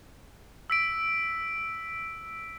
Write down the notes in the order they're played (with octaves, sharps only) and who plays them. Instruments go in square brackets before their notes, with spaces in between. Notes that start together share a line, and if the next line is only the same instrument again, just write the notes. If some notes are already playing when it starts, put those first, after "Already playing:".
[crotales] E6 B6 D7